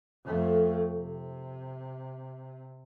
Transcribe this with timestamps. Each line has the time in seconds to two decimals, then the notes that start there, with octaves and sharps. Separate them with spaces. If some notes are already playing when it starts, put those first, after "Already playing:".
0.25 F2 A3
0.93 C3